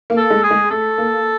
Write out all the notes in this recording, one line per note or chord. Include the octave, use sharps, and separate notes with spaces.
A#3
A4
G#3
G#4
G#3
A3 A4
A#3